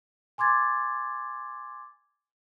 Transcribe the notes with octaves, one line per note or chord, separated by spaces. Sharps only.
G#5 C6 D6 G#6 A6